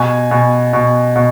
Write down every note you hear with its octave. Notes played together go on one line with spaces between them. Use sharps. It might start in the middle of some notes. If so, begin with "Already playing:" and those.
Already playing: B2 G#5
B2
B2
B2